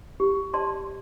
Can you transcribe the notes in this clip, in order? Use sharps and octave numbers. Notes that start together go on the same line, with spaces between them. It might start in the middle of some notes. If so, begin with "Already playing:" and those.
G4
D5 A5 C6